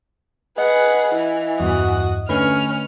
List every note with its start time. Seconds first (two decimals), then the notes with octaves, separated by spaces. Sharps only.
0.58 G#4 B4 D#5 F#5
1.15 E3 E4
1.60 E2 G2 F#4 D#6
2.29 D3 A3 C#4 B4 F6